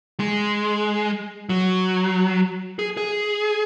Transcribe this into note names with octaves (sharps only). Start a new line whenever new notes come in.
G#3
F#3
G#4
G#4